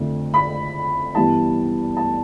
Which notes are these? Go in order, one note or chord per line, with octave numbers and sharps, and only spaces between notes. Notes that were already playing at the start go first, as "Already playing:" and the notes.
Already playing: F2 D3 F3 A3
B5
G2 E3 G3 B3 A5
A5